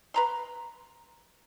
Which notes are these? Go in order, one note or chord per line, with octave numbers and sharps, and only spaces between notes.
B4 A#5 C6